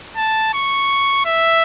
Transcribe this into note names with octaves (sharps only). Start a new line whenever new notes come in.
A5
C#6
E5